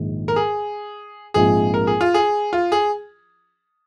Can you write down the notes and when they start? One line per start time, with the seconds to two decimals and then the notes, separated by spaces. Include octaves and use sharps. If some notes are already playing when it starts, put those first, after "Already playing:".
Already playing: A#1 G#2 D#3
0.28 A#4
0.36 G#4
1.34 A#1 G#2 F3 G#3 C4 G#4
1.74 A#4
1.87 G#4
2.01 F4
2.14 G#4
2.53 F4
2.72 G#4